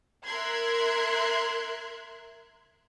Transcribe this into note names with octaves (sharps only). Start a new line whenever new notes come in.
A#4 E5 C6 F#6 G#6